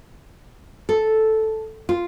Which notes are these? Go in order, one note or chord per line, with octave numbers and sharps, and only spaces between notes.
A4
F4